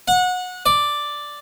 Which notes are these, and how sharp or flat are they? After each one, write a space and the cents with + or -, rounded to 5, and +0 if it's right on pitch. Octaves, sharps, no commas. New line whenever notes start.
F#5 -25
D5 +0